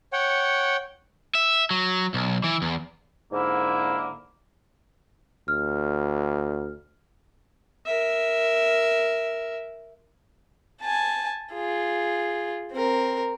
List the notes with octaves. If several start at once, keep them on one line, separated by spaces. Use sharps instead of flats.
C#5 F#5 G5
E5
F#3
B1
E3
E2
G#2 D3 A#3 E4
D2 F6
A#4 E5
G#5 A5
F4 G#4
C4 A#4